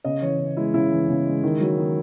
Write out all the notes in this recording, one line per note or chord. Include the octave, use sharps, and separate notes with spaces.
C#3 D#5
E3 C#5
C#3
G#3 E4
C#3 E4
E3
C#3
G#3
D#3
F#3
D#3